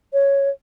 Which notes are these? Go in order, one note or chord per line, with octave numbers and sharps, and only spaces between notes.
C#5